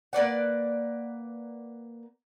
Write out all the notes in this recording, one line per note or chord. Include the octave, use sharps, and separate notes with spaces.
A#3 B4 D5 F#5